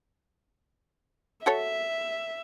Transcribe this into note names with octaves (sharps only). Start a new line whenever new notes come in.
F#4 A4 C#5 E5